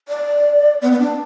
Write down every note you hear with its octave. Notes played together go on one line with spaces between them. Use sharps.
D5
B3
B3
D4